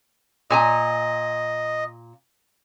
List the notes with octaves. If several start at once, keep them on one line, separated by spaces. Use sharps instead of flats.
A#2 D#5 G#5 A#5